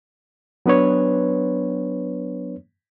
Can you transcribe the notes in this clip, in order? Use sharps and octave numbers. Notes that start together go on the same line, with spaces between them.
F#3 B3 D4 B4 C#5